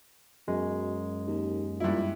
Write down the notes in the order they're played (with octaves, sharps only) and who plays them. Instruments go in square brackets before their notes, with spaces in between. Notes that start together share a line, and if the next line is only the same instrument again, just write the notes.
[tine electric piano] F#2 G#3 [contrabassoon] B2
[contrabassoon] D#2
[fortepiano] G2 E4 [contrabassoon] A#2